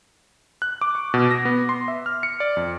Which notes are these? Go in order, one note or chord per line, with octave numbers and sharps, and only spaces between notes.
F#6
D6
C#6
B2
A#6
B3
C6
E5
F6
C#7
D5
F2